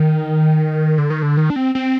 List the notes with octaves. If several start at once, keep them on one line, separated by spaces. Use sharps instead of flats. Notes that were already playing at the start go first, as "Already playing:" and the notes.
Already playing: D#3
D3
D#3
D3
D#3
D4
C4
C4